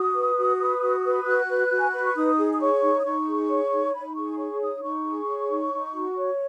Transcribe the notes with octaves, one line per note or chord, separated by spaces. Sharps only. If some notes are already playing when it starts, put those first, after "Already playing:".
Already playing: F#4 D#6
B4
F#4
B4
F#4
B4
F#4 F#6
B4
F#4
G#5
B4 B5
C#6
D#4 D#6
G#4
D#6
C#5 C#6
D#4
D#6
D#4 C#6
G#4
C#5
D#4
D#4 B5
G#4 C#6
C#5 C#6
D#4 D#6
D#4 C#6
G#4
C#5
D#4
D#4
F#4
C#5